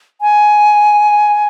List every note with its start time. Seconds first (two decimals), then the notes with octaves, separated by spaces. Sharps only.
0.21 G#5